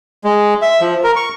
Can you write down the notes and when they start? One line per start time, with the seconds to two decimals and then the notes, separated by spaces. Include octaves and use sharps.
0.24 G#3
0.62 E5
0.81 F3
1.04 A#4
1.16 C#6